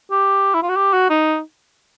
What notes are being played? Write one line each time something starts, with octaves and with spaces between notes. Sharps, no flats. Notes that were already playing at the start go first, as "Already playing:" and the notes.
G4
E4
F4
F#4
G4
F#4
D#4